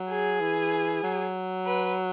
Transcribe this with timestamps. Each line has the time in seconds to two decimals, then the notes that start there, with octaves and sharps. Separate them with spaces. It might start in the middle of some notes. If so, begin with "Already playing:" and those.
Already playing: F#3
0.09 G#4
0.41 E3
1.03 F#3
1.66 B4